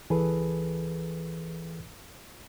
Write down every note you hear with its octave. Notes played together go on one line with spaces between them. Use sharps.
C#2 E3 G#4 A4 B4